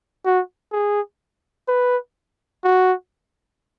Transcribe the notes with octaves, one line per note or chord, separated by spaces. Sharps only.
F#4
G#4
B4
F#4